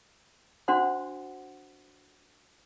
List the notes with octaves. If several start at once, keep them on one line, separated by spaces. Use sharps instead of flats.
D4 F#4 C5 F#5 C6